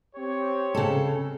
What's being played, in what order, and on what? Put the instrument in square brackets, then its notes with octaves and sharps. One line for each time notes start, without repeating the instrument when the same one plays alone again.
[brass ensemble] C4 G4 C#5
[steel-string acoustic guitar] C#3 A4